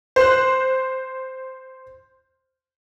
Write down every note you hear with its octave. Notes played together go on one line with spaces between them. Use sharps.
C5 F#6